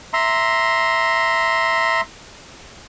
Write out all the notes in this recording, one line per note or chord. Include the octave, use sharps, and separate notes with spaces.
E5 A#5 C6